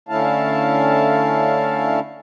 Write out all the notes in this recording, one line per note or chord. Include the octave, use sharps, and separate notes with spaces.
D3 A3 C#4 E4 F5 A5